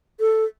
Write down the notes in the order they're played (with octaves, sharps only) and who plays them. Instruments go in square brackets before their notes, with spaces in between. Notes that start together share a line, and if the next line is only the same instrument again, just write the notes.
[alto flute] A4